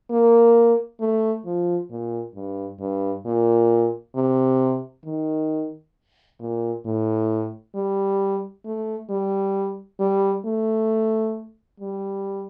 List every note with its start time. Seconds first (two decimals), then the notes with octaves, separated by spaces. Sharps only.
0.11 A#3
1.01 A3
1.45 F3
1.90 A#2
2.35 G2
2.80 G2
3.26 A#2
4.15 C3
5.05 D#3
6.40 A#2
6.85 A2
7.75 G3
8.65 A3
9.10 G3
10.00 G3
10.45 A3
11.80 G3